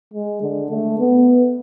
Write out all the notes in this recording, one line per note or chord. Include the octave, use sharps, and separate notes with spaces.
G#3
D3
A3
B3